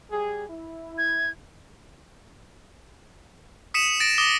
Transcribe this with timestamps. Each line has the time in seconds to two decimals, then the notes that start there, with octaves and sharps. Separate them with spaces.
0.11 G3 G#4
0.49 E4
0.98 G#6
3.74 D#6 B6 C#7 D#7 E7
4.00 A6 A#6 D7
4.18 D6 D#6 A#6 G7